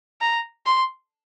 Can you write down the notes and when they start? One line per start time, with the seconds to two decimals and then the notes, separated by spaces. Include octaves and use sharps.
0.21 A#5
0.66 C6